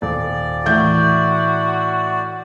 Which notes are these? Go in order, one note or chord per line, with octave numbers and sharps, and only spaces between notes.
D#1 D5
A2 E3 E4 F#4 G6